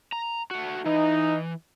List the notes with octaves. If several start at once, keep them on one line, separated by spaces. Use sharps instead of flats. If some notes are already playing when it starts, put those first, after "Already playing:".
A#5
A3 F#4
E3 D#4